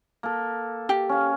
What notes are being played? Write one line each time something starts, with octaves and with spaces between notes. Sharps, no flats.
A#3 A4
G4
C#4 F5